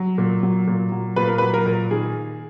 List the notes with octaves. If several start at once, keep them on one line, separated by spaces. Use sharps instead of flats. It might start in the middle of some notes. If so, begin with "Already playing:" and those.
Already playing: F#3
A#2
F#3
A#2
F#3
A#2 B4
A#4
F#3 B4
A#4
A#2
D#3 G#4